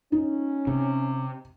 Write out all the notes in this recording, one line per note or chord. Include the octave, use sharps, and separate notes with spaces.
C#4 D#4
C3